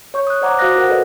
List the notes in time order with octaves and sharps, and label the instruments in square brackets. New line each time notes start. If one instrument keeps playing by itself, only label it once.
[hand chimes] C#5 C#6 G6
D#6 F#6
C5 D5 F#5 A#5 D6
F#4 C5 F5 D#6 F#6 A#6
F4 F#4 A#4 C5 F#5
A4 B4 D5 D#5